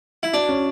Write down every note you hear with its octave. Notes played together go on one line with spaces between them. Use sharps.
E4
D4 F#4
C#4